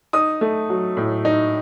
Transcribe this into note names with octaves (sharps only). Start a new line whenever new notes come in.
D#4 D#6
A3
F#3
A2
D#4